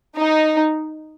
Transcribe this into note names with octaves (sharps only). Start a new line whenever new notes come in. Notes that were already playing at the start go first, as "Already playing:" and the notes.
D#4